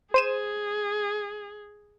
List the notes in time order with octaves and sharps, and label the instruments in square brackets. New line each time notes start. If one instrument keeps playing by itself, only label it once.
[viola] G#4 [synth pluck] C5 D#7 E7